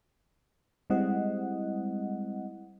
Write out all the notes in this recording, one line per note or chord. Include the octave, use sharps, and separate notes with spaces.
G3 G#3 C4 E4 D#5 F#5